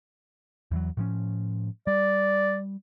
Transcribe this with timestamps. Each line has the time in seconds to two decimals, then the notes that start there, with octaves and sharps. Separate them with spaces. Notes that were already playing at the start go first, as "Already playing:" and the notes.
0.71 E2 E3 F#3
0.97 A2 F3 C#4
1.87 G3 D5